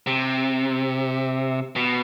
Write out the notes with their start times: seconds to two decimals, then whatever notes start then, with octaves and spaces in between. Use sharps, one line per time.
0.07 C3
1.76 B2